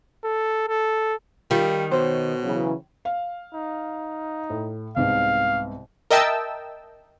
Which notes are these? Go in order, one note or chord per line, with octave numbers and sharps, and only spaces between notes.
A4
A4
D#3 G3 F4
B2 C5 C#5
C#3 E3 F#3
F5
D#4
A2
C2 G#2 B3 F5
A#4 D#5 E5 G5 A5 E6